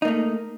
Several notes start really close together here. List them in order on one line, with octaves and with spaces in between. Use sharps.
D#4 A#3 A3